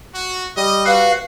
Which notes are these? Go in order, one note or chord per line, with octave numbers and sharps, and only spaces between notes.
F#4
G3 D#5
F#4 B4 F5